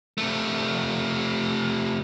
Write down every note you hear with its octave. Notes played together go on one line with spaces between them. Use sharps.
C3 A3